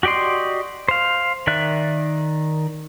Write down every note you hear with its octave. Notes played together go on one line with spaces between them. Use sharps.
F#4 G4 D5 D#5 C6
C5 F5
D#3 D5 E5 F#6